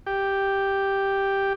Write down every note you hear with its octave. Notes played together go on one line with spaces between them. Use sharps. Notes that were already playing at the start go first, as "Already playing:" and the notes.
G4